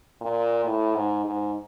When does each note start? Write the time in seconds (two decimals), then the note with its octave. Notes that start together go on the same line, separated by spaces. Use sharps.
0.21 A#2
0.65 A2
0.95 G#2
1.25 G#2